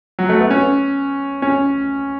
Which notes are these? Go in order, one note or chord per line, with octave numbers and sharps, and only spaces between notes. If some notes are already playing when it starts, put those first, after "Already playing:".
F#3
A3
B3
C#4
C#4